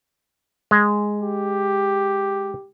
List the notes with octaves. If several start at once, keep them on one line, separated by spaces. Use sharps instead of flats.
G#3
G4